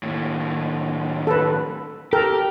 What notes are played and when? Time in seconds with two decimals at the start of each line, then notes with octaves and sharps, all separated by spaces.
0.03 D#2 A2
1.27 A4 B4
2.13 G4 A4 A#4